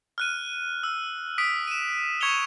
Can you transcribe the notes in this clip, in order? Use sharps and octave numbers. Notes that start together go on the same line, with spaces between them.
F6 F#6 D#7
E6
D#6 B6 D7
D#7 E7
C#6 G#6 C#7 E7 F7 G7